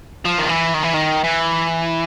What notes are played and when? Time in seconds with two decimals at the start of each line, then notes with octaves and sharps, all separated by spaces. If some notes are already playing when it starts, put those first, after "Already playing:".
0.25 F3
0.38 D#3
0.49 E3
0.74 D#3
0.84 E3
0.94 D#3
1.24 E3